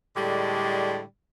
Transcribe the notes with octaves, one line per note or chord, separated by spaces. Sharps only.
A2 D3 G3 G#3